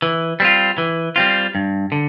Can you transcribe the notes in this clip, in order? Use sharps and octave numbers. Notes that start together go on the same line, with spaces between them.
E3
G3 C4 F4
E3
G3 C4 F4
G2
D3